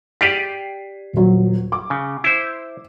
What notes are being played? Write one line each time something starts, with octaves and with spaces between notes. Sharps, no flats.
G4 D5 B6 C7 D#7
D#1 F#3
D6
C#3
E4 C5